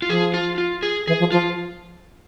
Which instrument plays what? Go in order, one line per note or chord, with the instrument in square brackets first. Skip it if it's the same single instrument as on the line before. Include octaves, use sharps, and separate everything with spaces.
[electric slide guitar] F4
[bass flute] F3 [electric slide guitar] G#4
[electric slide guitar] F4
F4
G#4
[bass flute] E3 [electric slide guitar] G#4
[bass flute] F3
[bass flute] F3 [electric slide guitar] F4